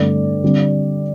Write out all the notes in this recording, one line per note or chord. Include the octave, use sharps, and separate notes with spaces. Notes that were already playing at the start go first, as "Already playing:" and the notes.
Already playing: G2 D3 A3 C4 D5
D3 G3 C4